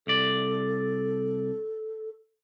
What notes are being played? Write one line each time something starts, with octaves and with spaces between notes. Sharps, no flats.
C2 A4 D5